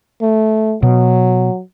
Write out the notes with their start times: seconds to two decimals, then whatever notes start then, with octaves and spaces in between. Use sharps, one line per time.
0.22 A3
0.83 B2 F#3